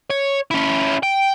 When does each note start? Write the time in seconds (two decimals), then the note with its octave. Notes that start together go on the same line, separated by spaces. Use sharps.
0.10 C#5
0.51 C#4 E4
1.03 G5